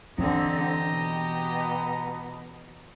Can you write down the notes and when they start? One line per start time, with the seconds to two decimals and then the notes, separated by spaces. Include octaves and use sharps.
0.18 D3 E3 C4 G4 D#5 A#5
0.90 B2